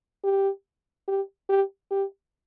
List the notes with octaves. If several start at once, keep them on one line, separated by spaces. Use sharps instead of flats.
G4
G4
G4
G4